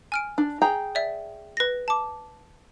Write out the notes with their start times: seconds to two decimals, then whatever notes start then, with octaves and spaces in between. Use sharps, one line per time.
0.12 G#5 F6 D7
0.38 D4
0.62 G#4 G5 A#5
0.95 D5 E5
1.57 B4 A#6
1.88 A5 D6